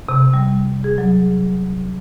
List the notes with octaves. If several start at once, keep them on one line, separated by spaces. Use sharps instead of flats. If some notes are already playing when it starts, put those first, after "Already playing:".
C3
G3
G#4
F#3